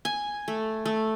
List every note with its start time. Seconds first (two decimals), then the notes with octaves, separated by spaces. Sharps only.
0.05 G#5
0.48 A3
0.86 A3